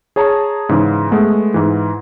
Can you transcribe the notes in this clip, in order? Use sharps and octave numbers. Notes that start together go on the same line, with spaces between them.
G#4 C#5 A5 A#5
G#2 C#3 E3
G#3 A3 B3
G#2 E3